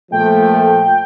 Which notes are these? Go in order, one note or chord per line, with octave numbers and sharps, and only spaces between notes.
A#2 F3 A3 G5